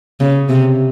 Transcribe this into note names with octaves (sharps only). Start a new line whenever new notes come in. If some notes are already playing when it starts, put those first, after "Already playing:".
C#3
C3